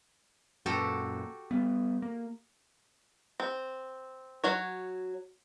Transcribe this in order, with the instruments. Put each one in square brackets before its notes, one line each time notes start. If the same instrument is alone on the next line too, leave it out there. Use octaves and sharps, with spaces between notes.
[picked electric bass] F#2 A#2 [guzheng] F#4 G4 A4
[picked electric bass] G3 B3
A#3
[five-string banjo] C4
F#3 F#4 C#5